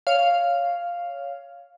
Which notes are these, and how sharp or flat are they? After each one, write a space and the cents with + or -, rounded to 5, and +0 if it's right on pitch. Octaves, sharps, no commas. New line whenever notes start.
C#5 +15 F5 +0